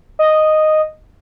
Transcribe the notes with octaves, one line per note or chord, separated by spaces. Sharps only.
D#5